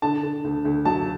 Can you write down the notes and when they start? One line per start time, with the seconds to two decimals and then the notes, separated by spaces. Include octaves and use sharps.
0.02 D3 A5
0.23 D3
0.44 D2
0.65 D2
0.85 F#3 A5